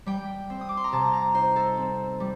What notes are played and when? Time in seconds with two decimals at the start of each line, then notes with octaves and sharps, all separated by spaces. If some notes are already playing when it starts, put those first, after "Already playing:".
0.06 G3 G5
0.50 C4
0.61 D#6
0.69 D6
0.77 C6
0.84 A#5
0.92 C3 A5
1.13 A#5
1.34 D#4 C5
1.56 A4
1.77 C4
2.20 G3